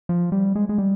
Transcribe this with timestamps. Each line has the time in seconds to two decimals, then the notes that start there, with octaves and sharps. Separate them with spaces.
0.09 F3
0.32 G3
0.55 G#3
0.69 G#3
0.78 G3